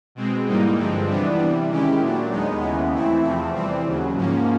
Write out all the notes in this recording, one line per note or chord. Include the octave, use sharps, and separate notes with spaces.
B2 G#3 C4
G#2 E3 G3 A#3 D#4
G2 D3 F3 G#3 C4
C3 E3 G3 B3 D4
C3 E3 G3
D#3 G#3 C#4 E4 G4
A#2 F#3 A3 D4
D#2 D#3 G#3 B3 D#4
D#2 C#3 E3 G#3 B3
E3 A3 C4 E4
E2 C3 F3 A3 C4
E3 G3 C4
D#2 C#3 F#3
G#2 F3 A#3 C#4